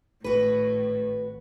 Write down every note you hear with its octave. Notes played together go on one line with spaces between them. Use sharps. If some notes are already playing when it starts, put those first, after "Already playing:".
G#1 A2 F#4 B4